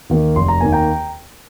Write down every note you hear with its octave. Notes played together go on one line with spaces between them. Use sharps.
D#2 D#3 A#3
F1 C6
A#5
D#2 D#3 A#3 G#5
G5 A#5